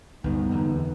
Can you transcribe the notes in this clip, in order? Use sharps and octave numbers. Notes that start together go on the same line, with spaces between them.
D2 G2 G3 B3 D#4
E2 D3